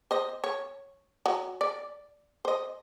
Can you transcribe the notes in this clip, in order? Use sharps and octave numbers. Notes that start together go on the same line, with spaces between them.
C5 D#5
C#5
F#3
D5
C5 D#5